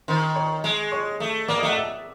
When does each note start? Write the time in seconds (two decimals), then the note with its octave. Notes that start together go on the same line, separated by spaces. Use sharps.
0.08 D#3 C5 C6
0.35 C#5 C#6
0.64 G#3
0.92 C#5 C#6
1.20 A3
1.48 A#3 D5 D6
1.57 D#5 D#6
1.63 A3 F#5 F#6
1.76 E5 E6